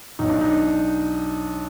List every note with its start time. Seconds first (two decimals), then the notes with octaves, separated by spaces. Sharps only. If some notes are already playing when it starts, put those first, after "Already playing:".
0.19 B1 D#4
0.30 D4
0.41 D#4